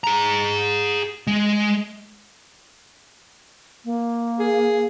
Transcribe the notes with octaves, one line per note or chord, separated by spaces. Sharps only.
G#4 A#5
G#3
A#3
G#4